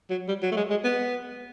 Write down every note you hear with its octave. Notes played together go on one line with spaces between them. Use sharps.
F#3
G3
F#3
A3
G#3
G#3
B3